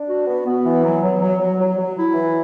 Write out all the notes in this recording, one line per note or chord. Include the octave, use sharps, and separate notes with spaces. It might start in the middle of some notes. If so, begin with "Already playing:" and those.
Already playing: D4
F#4
B3
B3
E3
F#3
F#3
F#3
F#3
F#3
F#3
E4
E3